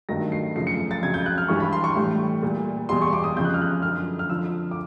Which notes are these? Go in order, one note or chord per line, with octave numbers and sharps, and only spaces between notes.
G2 D#3 F#3 A3 A#6
C7
F#2 C#3 F3 A3 C7
C#7
A6
F2 C#3 F#3 G#6
G6
F#6
F6
G2 E3 G3 C#6
B5
C6
C#6
A2 E3 G3
A#2 G3
E2 B2 G3 C6
C#6
D6
D#6
F2 C#3 F3 G6
F#6
F6
F#6
F#2 D3 F3 F6
F6
F2 D3 F3 E6
D6